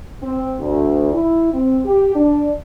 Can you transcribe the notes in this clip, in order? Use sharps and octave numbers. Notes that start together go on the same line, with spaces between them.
C4
D2
E4
C4
G4
D4